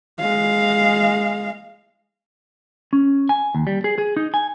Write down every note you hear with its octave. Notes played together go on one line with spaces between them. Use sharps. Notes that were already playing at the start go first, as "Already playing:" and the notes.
G#3 F5
C#4
G#5
D#2
G3
G#4
G#4
D#4
G#5